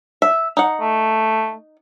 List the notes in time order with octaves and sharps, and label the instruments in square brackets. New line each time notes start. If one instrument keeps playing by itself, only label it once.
[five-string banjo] E5
D#4 F#5
[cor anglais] A3